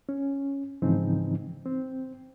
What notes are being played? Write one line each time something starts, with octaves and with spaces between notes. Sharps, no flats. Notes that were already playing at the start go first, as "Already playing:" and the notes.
C#4
G#2 C#3 E3 F3 C4 D#4
C4